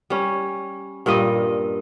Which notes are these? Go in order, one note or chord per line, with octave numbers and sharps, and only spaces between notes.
G3 C#4
G2 A#2 G3 D#5